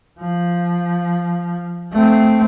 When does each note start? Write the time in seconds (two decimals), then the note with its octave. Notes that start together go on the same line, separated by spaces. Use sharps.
0.19 F3
1.92 A3 C4